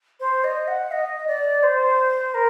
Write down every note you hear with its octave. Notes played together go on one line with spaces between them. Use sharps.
C5
D#5
F#5
D#5
D5
C5
A#4